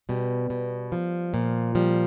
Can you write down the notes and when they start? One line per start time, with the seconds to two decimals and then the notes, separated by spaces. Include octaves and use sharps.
0.09 B2 G3
0.50 B2
0.92 F3
1.34 A#2
1.75 F3 G3